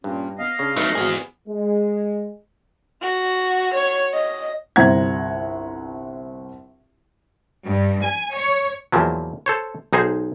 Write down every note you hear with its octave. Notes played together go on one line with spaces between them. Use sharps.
G2 A#2 C#4
B3 D#5 F5
C#3 D4
F#3 A3 D#4 B4
G#1 B3 F#4 G#4
G#3
F#4
C#5
D#5
G1 C2 C5 F#5 A#5 G#6
G2
G#5
C#5
E2 A#2 F3 F#3
A4 C5 C#5
B1 D#4 G#4 C5 G#5